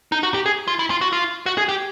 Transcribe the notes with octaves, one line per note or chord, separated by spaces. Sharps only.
D#4
F#4
G4
G#4
F4
E4
F4
F#4
F4
F#4
G#4
G4